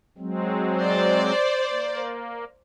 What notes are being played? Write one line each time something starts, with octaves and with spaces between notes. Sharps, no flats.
F#3 G#3 C4
C5 D5
A#3